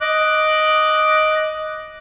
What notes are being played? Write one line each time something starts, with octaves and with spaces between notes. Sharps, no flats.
D#5 D6 F#6